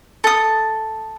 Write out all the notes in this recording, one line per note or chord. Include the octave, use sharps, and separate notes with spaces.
A4 D#6